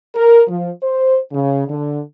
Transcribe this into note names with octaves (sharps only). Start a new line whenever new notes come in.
A#4
F3
C5
C#3
D3